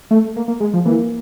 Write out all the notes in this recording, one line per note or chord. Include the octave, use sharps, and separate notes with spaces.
A3
A#3
A#3
G#3
F3
E3 A#3